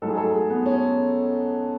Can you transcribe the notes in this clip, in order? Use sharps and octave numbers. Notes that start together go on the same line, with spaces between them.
G#2 F#3 A3 A4
G#4
A4
G#4
B3
C#4